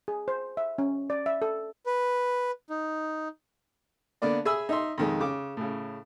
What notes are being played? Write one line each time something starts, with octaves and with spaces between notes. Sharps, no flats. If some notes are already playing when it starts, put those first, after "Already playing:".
G#4
C5
E5
C#4
D5
E5
A4
B4
D#4
D3 A#3 B3 D4 D5
G#4 E5 G#5 B5 D#6 E6
D#4 E5 C6
F2 D#3 G#3
C#3 D6
A2 C#3